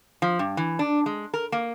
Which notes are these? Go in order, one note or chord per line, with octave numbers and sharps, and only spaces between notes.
F3
G2
E3
D4
G#3
A#4
A#3